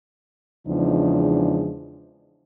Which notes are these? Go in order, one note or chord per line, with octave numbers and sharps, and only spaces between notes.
E2 C#3 F3 G#3 D4 D#4